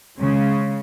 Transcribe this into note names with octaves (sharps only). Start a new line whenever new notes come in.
C#3 G#3